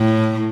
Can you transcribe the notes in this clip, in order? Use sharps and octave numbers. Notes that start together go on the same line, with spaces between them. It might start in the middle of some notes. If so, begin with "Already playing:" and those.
Already playing: A2